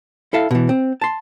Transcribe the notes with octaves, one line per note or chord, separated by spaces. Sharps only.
E4 A4 E5 F5
B2 E3
C4
A5 C6